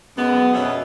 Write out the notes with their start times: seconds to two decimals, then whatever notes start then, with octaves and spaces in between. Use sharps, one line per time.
0.17 F#2 G#3 B3
0.54 F2 B2 B3 C#4 E5